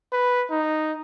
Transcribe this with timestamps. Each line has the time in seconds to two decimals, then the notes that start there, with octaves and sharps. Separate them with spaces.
0.13 B4
0.50 D#4